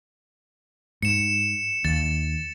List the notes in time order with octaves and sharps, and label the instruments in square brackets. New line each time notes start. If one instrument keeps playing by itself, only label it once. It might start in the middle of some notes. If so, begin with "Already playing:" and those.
[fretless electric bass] G#2 [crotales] C#7 E7
[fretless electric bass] D#2 [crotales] A6